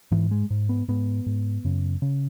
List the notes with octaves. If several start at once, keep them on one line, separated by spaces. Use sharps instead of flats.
G#2 E3
G#3
G#2
B3
G#2 B3
G#2
F#2 C#3
C#3